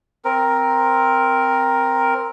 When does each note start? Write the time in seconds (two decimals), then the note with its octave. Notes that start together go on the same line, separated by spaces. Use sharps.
0.25 C4 A#4